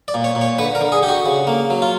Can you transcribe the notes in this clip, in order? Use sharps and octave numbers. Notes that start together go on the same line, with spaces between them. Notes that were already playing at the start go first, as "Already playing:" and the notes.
D5
A#2
C#5
A#2
C#5
D3 B4
A#4
D3
G#4
D3 G4
F#4
C#3
A#3
F#3
F4